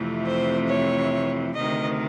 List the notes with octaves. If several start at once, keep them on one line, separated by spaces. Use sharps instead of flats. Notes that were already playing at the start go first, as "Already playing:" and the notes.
Already playing: F2 C3 E3 A3
C5
C#5
D2 C3 D#3 D#5